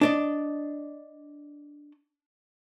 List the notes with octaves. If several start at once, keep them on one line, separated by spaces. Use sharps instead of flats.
D4 D5 D#5